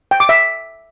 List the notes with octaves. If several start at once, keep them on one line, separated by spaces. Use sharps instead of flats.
G5
D6
E5